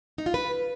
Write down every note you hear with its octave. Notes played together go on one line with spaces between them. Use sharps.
D#4
F4
B4